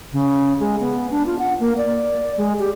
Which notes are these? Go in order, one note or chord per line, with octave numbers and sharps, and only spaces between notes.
C#3
G#3
B3
D4
F4
F#5
A#3
D5
G#3
G4